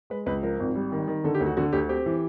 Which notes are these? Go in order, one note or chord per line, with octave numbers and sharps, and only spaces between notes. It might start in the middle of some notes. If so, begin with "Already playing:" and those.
G#3 B4
C#2 B4
F3 A#4
G#1
G3
D#3
D#3
D3 A4
G4
D2
F#4
D3 F#4
D2 G4
C4 G4
E3